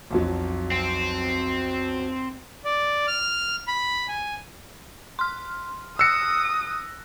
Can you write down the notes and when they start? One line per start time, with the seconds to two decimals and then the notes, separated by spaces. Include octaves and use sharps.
0.11 B1 F2 F#3
0.72 C4
2.65 D5
3.08 F6
3.68 B5
4.08 G#5
5.19 C6 F6
5.99 D#6 E6 F#6 A#6 C#7